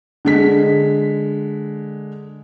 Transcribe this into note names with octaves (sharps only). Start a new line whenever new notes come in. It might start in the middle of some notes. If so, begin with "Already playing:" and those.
D3 G#3 B6